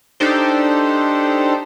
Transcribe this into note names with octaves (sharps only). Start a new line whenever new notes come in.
D4 D#4 G4 A4 C5